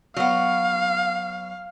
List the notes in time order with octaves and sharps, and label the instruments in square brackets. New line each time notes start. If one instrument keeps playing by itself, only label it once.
[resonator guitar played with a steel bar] F#3 B3 [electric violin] F5